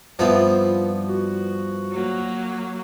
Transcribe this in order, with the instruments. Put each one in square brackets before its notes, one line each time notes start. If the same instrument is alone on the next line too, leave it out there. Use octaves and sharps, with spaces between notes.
[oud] G2 C4 F4 [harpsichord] F3 B3 E4
[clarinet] F#4
[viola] F#3 A#3